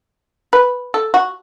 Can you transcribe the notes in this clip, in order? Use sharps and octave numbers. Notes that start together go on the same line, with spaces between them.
B4
A4
F#4